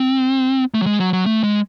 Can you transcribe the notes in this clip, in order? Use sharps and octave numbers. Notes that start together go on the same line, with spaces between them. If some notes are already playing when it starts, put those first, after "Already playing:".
Already playing: C4
A3
F#3
G#3
F#3
F#3
A3
G#3